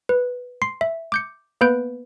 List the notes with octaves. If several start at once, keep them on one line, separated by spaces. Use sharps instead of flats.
B4
C6 C7
E5
D6 G6 C#7
A#3 B3 B4 B5 G6 D7